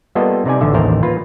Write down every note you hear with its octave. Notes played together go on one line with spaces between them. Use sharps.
G3 A#3 B3 F4 A4 D#5
C3 D#4 D5 G#5
A1 D3 E5
A1 D#2 A3 A#4 C5
A#3 F4 B4